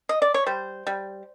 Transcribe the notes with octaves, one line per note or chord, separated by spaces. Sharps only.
D#5
D5
C#5
G3 C5
G3